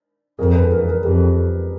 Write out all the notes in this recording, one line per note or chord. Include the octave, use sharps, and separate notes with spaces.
F2 G#4 A#4
A4 B4
E2 G#4 A#4
G#4 A#4
F2 G4 A4